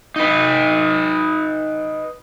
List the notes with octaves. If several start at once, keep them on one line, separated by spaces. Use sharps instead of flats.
D#4 B4